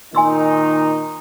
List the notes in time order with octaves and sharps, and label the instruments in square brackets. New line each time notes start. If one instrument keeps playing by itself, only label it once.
[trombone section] A#2 D#3 D#4 [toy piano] G#5 C6 E6